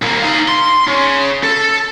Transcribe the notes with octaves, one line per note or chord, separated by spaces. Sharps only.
C2 A#3
D#4 F5
C6
C#3
A4